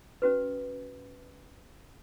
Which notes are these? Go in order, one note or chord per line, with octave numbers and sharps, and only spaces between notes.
C#4 F#4 B4